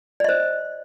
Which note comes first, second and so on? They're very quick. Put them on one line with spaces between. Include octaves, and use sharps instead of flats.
D5 D#5 C5